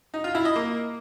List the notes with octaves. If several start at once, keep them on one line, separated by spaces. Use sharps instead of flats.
D#4
F4
E4
D#5
A#3